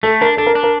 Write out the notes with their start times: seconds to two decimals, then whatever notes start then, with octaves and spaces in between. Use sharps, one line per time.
0.03 A3 A4
0.21 D4 A#4
0.37 D4 A4
0.46 A#4
0.55 D4
0.63 A#4